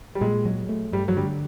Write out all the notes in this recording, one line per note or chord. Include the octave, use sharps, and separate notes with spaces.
G3
A#2 G#3
F#3
A3
G2 G3
F#3
D3 G3